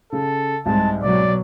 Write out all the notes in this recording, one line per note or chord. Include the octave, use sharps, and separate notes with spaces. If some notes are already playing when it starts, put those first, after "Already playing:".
C#3 A4
C2 G#2 G#3 A5
B2 F#3 D5